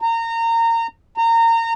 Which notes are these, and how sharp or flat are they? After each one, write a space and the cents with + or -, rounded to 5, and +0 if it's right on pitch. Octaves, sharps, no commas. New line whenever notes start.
A#5 -25
A#5 -25